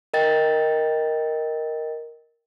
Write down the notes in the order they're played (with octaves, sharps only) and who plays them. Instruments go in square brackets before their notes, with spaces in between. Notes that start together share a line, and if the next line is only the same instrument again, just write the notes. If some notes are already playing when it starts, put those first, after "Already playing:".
[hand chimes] A#4 D#5 G5 A6